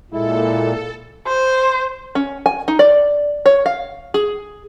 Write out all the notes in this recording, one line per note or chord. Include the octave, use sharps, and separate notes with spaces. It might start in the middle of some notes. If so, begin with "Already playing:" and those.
A#2 G#3 E4 A4
C5
C#4
G#5
D#4
D5
C#5
F5
G#4